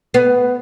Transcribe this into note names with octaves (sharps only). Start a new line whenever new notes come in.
B3